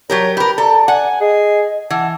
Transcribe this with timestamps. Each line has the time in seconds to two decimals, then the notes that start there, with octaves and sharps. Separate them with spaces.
0.10 F#3 G4 A#4 C#5
0.37 G4 A#4 B4 B5
0.58 A4 D5 A#5
0.88 D5 F#5 G#5
1.21 G#4 D#5
1.90 E3 F#5 A5